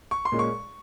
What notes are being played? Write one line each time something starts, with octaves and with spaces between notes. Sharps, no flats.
C#6
C6
A#2 G#3 C#4
C#6